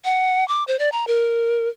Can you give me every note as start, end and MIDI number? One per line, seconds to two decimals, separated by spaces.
0.04 0.46 78
0.48 0.64 86
0.68 0.77 72
0.79 0.89 74
0.92 1.05 82
1.07 1.69 70